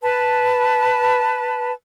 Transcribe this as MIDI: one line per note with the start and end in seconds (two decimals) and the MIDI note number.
0.02 1.71 71
0.02 1.71 81